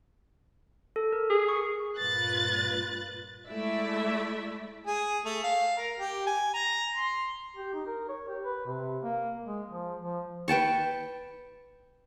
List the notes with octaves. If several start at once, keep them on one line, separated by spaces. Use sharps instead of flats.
A4
A#4
G#4
C#6
G2 A#2 F4 B4 F#6 A6
G#3 A3 E4 D5 E5
G#4
A3
F5
A#4
G4
G#5
A#5
C6
G4
D#4
A#4
C#5
G4
B4
C3
A#3
G#3
F3
F3
B4 G5 A5 C#6